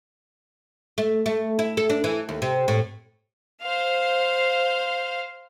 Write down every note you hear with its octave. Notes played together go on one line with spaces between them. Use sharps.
A3
A3
E4
A4
D4
E3
D#2
C3
A2
C5 F5